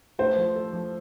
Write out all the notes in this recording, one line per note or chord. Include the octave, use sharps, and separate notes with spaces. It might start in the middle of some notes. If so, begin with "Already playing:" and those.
A3 C5
F3
A4
F3